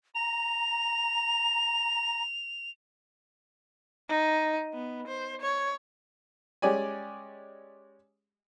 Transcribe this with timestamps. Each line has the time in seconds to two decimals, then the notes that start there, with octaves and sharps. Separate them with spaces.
0.15 A#5 F7
4.09 D#4
4.74 B3
5.07 C5
5.41 C#5
6.62 G#3 C#4 G4 D5 G#5